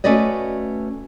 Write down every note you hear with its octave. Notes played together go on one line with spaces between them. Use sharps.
A3 C#4 F#4 B4 D5 D#5